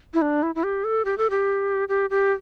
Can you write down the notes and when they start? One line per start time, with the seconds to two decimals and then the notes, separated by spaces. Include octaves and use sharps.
0.14 E4
0.22 D4
0.43 E4
0.55 E4
0.64 G4
0.84 A4
1.05 G4
1.18 A4
1.30 G4
1.89 G4
2.10 G4